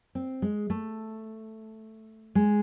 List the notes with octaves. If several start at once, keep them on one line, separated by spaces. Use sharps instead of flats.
C4
G#3
A3
G#3